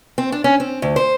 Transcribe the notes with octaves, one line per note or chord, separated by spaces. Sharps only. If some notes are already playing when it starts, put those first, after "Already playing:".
C4
D4
C#4
C4
D2
C5